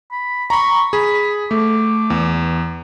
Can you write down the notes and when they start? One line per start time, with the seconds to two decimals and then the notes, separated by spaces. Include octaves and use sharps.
0.11 B5
0.50 A#5 B5 C#6
0.93 G#4 B5
1.51 A3 D6
2.10 E2